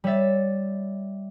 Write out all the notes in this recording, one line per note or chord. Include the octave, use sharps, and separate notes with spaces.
G3 C#5 E5 A6